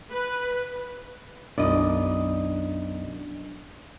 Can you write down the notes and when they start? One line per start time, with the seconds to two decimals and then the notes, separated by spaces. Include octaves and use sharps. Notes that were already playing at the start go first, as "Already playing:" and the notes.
0.11 B4
1.58 B1 F#2 D4 E4 D5 D#5 D#6